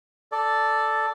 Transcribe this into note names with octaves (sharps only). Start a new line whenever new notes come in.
A4 D5